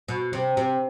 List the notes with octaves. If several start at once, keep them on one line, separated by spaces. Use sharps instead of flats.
B2
C3
C3